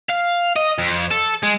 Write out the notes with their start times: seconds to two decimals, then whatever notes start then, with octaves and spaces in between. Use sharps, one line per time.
0.09 F5
0.56 D#5
0.78 F2
1.11 A4
1.43 G#3